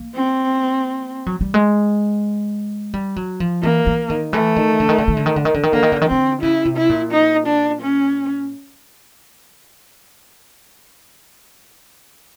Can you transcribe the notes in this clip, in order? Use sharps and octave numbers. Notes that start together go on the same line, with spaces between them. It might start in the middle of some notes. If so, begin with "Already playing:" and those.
Already playing: A#3
C4
F#3
G3
G#3
G3
F#3
F3
E3 A#3
E3
D#3
E3 A3
D#3
D3
D#3
D3
D#3
D3
D#3
D3
D#3
D3
D#3
D3 A#3
D#3
D3
D#3
D3 C4
C#3 E4
C3
E4
A#2
D#4
D4
C#4